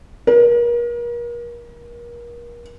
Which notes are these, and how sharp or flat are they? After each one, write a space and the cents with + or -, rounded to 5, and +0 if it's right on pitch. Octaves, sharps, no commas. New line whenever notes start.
A#4 +35